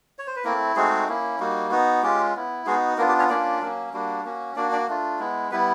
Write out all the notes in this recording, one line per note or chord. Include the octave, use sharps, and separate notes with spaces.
C#5
C5
B4
A3 A#3 C4 E4 A#4
G#3 A3 C4 D#4 F#4 G#4
A#3 C#4 E4
G3 A#3 D#4 F#4
B3 D#4 F#4
G#3 C#4 F4 G4
B3 E4
G#3 B3 D#4 F#4 G#4
A#3 B3 D4 F4 A#4
G4
C#4 C#5
A#3 C#4 D4 F4 D5
F#3 A#3 C#4
G3 A#3 D4 F#4
A#3 C#4 F#4
A#3 D4 F#4 D5
D4 D5
A3 D4 F4
G#3 B3 E4
G3 B3 E4 B4